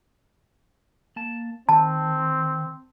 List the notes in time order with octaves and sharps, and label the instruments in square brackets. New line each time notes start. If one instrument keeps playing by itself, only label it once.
[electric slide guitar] A#3 A5
[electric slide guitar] D#3 [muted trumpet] C4 [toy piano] A5